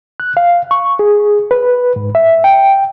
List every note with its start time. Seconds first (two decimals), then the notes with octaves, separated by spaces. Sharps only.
0.20 F#6
0.37 F5
0.71 C#6
0.99 G#4
1.51 B4
1.96 G#2
2.15 E5
2.44 G5